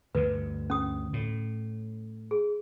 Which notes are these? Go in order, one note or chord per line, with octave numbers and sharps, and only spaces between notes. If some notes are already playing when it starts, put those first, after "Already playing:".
D2 G2 D3 B4
C#4 D#6
A2
G#4